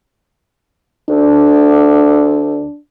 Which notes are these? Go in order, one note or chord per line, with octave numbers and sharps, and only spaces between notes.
D2 D4